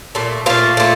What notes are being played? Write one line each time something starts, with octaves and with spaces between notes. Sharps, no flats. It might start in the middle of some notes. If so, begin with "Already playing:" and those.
A#2 A3
A#2 A3 F5
A#2 A3